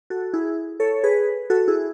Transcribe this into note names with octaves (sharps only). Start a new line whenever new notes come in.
F#4 A4
E4 G#4
A4 C#5
G#4 B4
F#4 A4
E4 G#4